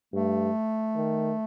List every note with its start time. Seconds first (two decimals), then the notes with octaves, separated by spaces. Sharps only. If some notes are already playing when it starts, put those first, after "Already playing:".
0.13 G2 A3
0.96 D#3